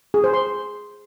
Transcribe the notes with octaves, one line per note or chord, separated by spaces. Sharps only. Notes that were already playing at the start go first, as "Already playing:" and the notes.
G#4
C5
C6